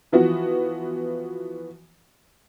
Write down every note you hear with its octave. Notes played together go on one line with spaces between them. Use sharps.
E3 F3 B3 F#4